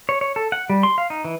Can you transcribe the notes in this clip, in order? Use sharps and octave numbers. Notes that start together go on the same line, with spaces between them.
C#5
C#5
A4
F#5
G3
C6
F5
D#4
E3